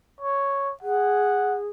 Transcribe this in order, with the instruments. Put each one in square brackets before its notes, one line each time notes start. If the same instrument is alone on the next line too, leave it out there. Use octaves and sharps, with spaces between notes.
[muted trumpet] C#5
[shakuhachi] G#4 [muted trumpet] F#5